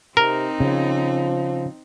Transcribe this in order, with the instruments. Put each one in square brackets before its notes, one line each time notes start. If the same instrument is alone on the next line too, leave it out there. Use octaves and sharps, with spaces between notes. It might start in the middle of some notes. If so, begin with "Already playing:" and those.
[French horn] C3 [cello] C4 D#4 [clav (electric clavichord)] A#4
[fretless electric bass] C#3 [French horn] F3